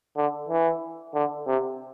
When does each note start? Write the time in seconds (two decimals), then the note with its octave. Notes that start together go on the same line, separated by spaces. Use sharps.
0.17 D3
0.49 E3
1.15 D3
1.47 C3